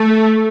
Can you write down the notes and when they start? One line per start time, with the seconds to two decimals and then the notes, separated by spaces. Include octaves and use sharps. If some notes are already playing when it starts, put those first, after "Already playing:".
Already playing: A3